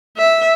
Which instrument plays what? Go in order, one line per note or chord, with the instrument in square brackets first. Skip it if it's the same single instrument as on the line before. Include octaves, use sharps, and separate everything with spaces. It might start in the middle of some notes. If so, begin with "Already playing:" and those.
[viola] E5